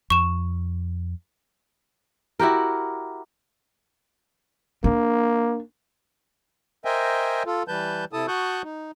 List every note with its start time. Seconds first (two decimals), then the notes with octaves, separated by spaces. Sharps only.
0.10 F2 C#6 E7
2.39 E4 F#4 G4 A#4
4.84 A#3 D4
6.85 A#4 C5 D#5 E5 G5 G#5
7.46 F4 A4
7.68 E3 G3 B4 A5 G6
8.13 C3 E4 A4 A5 D#6
8.28 F#4 A5 C#6 D#6 F#6 G6
8.63 D#4